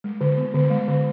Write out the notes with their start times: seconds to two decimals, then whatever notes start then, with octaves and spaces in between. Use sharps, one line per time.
0.04 G#3
0.21 D3
0.37 B3
0.54 D3
0.70 G#3
0.88 D3